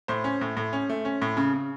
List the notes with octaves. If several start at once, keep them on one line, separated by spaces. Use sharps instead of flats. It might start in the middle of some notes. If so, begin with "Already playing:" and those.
A2 C5
C#4
A2
A2
C#4
A3
C#4
A2
C#3
C#3